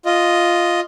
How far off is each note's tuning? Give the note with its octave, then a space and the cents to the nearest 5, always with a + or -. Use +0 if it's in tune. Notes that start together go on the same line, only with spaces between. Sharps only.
F4 +0 D#5 +0